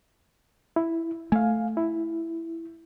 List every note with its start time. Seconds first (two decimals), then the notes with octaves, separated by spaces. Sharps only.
0.76 E4
1.32 A3 F5 G#5
1.77 E4